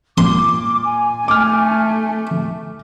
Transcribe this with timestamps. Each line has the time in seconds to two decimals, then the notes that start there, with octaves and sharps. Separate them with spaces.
0.18 A#2 C6 D6
0.82 G#5
1.28 A3 D6 F6